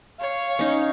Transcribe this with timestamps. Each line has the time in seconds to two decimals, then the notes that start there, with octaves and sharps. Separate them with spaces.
0.19 C#5 F5
0.59 C#4 D#4